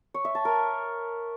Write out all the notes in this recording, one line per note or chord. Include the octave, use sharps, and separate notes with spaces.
C#5
E5
A5
A#4